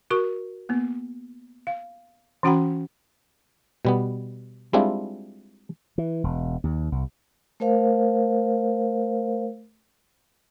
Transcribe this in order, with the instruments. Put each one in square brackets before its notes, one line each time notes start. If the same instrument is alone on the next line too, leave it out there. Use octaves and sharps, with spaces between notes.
[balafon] F#4 A#4 C#6
A#3 B3
F5
E3 C#4 F#4 F#5 G5 B5
[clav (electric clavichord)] B2 G3 B3
G3 G#3 C4 D4 E4 F4
[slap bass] E3
E1
D#2
C2
[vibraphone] A3 A#4 C5 F5